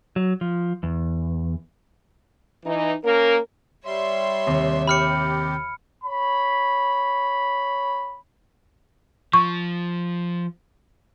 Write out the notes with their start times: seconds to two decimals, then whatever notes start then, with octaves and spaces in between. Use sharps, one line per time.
0.16 F#3
0.41 F3
0.83 E2
2.64 E3 D#4
3.04 A#3 C#4 A#4
3.85 G3 C#5 E5 C6
4.46 D#2 C3
4.87 G4 B5 F6 C#7
6.04 C#5 B5
9.33 F3 C#6